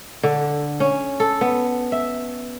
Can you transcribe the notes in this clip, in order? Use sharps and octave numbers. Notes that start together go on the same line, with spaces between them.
D3
C#4
A4
B3
E5